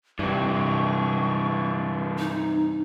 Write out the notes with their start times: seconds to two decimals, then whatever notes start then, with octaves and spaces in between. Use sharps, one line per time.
0.19 G2 C3 E3 F#3 C#6
2.19 D#4